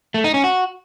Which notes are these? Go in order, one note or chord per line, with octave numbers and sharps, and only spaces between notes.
A3
D#4
C#4
F#4